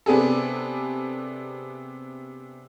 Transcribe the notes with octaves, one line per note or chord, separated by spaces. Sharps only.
C3 B3 D4 G#4 A4